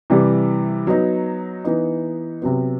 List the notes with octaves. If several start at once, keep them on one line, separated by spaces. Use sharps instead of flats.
C3 E3 G3
F#3 B3 D#4
E3 B3 D#4
C3 F#3 B3